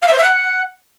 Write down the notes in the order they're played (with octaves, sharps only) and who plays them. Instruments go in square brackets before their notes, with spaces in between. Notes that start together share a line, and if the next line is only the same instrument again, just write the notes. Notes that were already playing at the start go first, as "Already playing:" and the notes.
[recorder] F5
E5
C5
E5
F#5